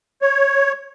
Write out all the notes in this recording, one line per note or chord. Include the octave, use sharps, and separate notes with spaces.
C#5